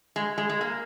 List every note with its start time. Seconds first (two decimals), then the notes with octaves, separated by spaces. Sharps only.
0.16 G#3
0.38 G#3
0.49 G#3
0.61 A#3